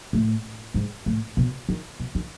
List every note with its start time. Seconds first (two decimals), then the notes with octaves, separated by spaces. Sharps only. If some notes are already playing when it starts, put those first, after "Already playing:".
0.13 A2
0.74 G#2
1.06 A2
1.37 B2
1.69 D#3
2.00 B2
2.15 D#3